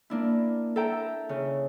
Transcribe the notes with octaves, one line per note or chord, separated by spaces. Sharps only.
A#3 D4 E4
A4 E5 G5 A#5
C#3